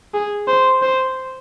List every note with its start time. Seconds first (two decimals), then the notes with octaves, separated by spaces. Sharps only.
0.14 G#4
0.48 C5
0.82 C5